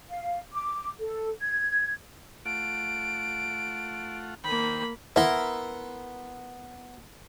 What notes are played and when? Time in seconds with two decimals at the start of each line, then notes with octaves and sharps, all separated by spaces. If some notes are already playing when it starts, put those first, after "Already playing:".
0.10 F5
0.54 D6
1.00 A4
1.40 G#6
2.46 A3 F4 F#5 D7
4.44 D#3 A#3 C5 G5 B5
5.16 B3 E4 A#4 C6